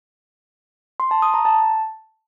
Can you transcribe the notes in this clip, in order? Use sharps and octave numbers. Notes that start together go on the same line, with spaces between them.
C6
A5
D#6
A#5
A5